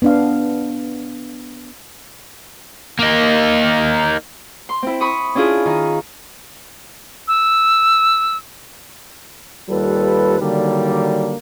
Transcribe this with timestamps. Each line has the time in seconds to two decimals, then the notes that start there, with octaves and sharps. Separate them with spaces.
0.02 B3 D4 F5
2.99 A#3 D#4
4.69 C6
4.83 C4 E4
5.01 B5 C#6 D#6
5.35 C#4 D4 E4 F4 G#4
5.66 D#3
7.28 E6
9.69 D#2 G3 F4 A4 B4
10.40 D3 D#3 F#3 G3 A#3 D4